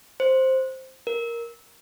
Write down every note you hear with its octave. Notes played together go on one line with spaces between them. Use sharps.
C5
A#4